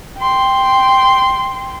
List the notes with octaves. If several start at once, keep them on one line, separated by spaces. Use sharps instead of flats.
G5 C6